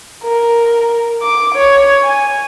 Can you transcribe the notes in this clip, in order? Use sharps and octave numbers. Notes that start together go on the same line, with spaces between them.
A#4
D6
C#5
G#5